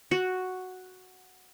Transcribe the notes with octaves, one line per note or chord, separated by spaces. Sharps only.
F#4